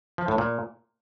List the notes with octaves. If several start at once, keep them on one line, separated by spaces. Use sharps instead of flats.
F3
A2
A#2